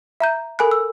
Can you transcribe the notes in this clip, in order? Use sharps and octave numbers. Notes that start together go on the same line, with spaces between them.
E5 A#5 G6
A4 A#4 G#5 B5 F#6
E6